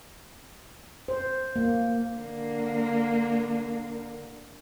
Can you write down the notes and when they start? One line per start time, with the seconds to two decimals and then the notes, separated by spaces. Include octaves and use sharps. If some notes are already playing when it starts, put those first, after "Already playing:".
1.08 C5
1.56 A#3
2.15 D3 A#3